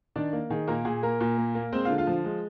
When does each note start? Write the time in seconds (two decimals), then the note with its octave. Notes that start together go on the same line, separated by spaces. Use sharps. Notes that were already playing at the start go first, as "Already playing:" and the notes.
0.16 D#3 D4 D5
0.33 A#3
0.50 D#3 G#4
0.68 A#2 A#3 A#4
0.85 A#2 G#4
1.02 A#3 A#4
1.20 A#2
1.38 A#3
1.55 A#3
1.72 G#3 C4 C5
1.85 D3 F4 F5
1.98 F4 F5
2.07 F3
2.25 G#3